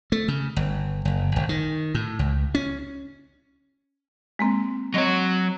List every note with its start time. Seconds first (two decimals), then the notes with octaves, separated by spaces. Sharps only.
0.12 A3
0.28 C#3
0.56 G1
1.05 F#1
1.36 G#1
1.49 D#3
1.95 A2
2.19 C#2
2.55 C#4
4.39 G#3 A#3 C4
4.94 F#3 C4 C#5 D#5 A#6